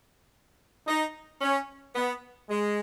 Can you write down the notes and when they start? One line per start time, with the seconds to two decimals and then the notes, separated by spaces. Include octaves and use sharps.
0.87 D#4
1.41 C#4
1.96 B3
2.49 G#3